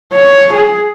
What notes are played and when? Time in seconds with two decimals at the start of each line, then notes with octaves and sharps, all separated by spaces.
0.13 C#5
0.52 G#4